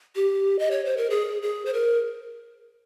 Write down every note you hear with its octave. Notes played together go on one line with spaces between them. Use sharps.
G4
D#5
C#5
C5
A#4
G#4
G#4
C5
A#4